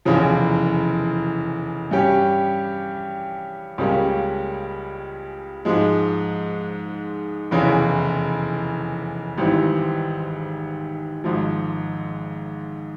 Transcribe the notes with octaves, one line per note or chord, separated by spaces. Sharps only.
F1 E2 C#3 F3
G2 G3 C#4 G4
C#2 C#3 G3 A#3 C#4
G#2 F3 G#3
F1 E2 C#3 E3
G#1 G#2 E3 G3 C4
G#1 G#2 F3